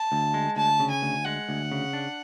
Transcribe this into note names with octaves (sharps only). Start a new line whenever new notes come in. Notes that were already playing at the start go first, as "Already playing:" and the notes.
Already playing: A5
D2
G#3
D2 A5
C#3
G#5
D2
G#3 F#5
D2
C#3
D4